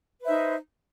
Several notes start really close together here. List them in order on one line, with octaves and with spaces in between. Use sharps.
B4 C5 E5 D#4